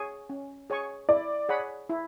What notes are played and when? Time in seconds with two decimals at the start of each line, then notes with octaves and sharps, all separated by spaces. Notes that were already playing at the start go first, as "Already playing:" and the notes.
Already playing: G#4 C#5 G#5 C#6
0.30 C#4
0.70 G#4 C#5 G#5 C#6
1.09 E4 D5
1.49 G#4 C#5 F#5 B5
1.89 E4